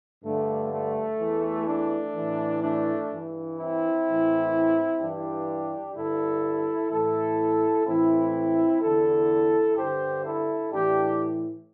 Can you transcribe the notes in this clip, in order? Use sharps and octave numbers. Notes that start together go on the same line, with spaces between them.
G2 D3 A3
A3
E2 E3
A3 D4
A2 E3
A3 D4
G2 E3
C4 E4
A2 E3
G2 E3 D4 G4
G2 D3 E4 A4
A2 E3 E4 A4
A2 E3 C4 E4
E2 D3 E4 A4
G2 D3 G4 C5
E4 A4
A2 E3 D4 G4